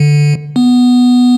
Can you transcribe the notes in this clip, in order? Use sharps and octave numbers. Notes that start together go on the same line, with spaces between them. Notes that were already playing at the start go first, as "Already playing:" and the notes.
Already playing: D3
B3